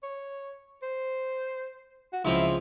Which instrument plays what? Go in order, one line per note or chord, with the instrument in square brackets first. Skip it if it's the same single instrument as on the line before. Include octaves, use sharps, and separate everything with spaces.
[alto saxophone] C#5
C5
F#4
[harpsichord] C#2 F3 C4 [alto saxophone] E4